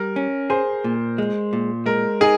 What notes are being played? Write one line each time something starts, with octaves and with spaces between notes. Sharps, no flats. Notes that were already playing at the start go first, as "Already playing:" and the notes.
Already playing: G3 A#4
C#4
G#4 C5
A#2
G#3
A#2
G#3 A#4
D#4 G#4